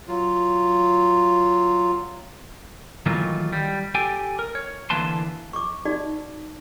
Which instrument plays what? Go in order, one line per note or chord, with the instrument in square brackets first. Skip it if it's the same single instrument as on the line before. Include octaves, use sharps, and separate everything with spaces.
[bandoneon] F#3 F4
[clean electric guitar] D#3 E3 F#3 A3 A#3 F4
G3
G4 A4 G5 G#5
A#4
C#5
D3 E3 A#3 B4 A5 C6
[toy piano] C#6 D6
D#4 F#4 D5